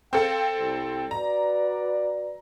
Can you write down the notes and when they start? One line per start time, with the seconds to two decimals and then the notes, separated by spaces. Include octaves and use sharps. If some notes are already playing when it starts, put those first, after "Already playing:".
0.13 C4 A4 F5 G5
0.58 C2
1.11 F#4 B4 D5 A#5